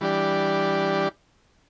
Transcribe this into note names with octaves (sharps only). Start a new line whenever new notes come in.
E3 G3 D4 G4 D5